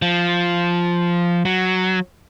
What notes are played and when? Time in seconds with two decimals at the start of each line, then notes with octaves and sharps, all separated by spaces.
0.02 F3
1.45 F#3